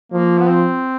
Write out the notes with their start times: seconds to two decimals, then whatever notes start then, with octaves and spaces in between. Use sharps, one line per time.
0.12 F3 A#3
0.39 B3
0.50 C4